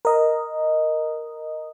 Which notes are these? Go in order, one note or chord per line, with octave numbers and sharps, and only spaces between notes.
A#4 D#5